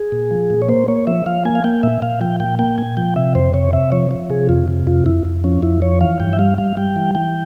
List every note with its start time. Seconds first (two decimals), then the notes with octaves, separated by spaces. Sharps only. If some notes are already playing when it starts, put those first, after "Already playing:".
Already playing: G#4
0.12 A#2
0.31 F3
0.50 A#2
0.62 C#5
0.69 A#3 C5
0.88 A#3 C#5
1.07 F3 E5
1.26 F3 F5
1.45 A#3 G#5
1.55 F5
1.64 A#3 G5
1.83 A#2 E5
2.02 A#2 F5
2.21 F3 G5
2.40 A#2 G5
2.59 A#3 G5
2.78 A#2 G#5
2.97 F3 G5
3.16 C3 E5
3.35 F2 C5
3.54 C3 C#5
3.73 C3 E5
3.92 F3 C#5
4.11 F3
4.30 C3 G#4
4.49 F2 F4
4.68 C3
4.87 F2 F4
5.06 F2 E4
5.25 F2
5.44 F3 C#4
5.62 F2 E4
5.82 F3 C#5
6.01 E3 F5
6.20 G2 G5
6.33 E5
6.39 G3 F5
6.58 G3 F5
6.77 G3 G5
6.96 E3
7.15 E3 G5